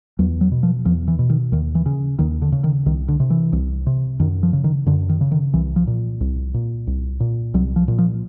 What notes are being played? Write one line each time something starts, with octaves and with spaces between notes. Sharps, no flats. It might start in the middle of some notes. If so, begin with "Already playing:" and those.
E2 F#3
F#3
B2
F3
E2 F3
E3
B2
D#3
D#2 D#3
E3
C#3
D#2 D#3
D3
C#3
D#3
C2 D#3
D3
C3
E3
C2
C3
F#2 D#3
F3
C#3
D#3
F#2 D3
D#3
C#3
D#3
C2 E3
F3
A#2
C2
A#2
C2
A#2
C2 F#3
F3
A#2
F3